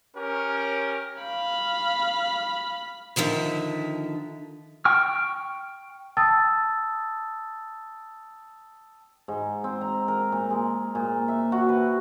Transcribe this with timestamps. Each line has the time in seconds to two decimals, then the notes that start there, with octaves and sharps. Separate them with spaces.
0.15 C#4 G4 A#4
1.22 F5 B5
3.16 D3 D#3 F3 E5
4.85 G5 C#6 F6
6.17 G5 A5 D#6 E6 A6
9.28 G#2
9.64 C4
9.81 A#5
10.08 A#4
10.32 A#2
10.50 G#3
10.95 A#2
11.28 E5
11.52 F#4
11.69 B4